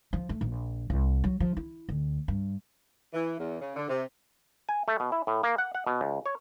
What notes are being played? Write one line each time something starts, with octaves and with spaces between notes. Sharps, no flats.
F3
A3
A#1
C2
F#3
F3
E4
D2
G2
E3
E2
C#3
D3
C3
G#5
A3
B2
E4
A2
A#3
F#5
F#5
B2
C#2
C#5